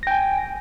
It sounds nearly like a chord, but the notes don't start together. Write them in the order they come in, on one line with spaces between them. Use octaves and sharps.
A#6 G5 G#5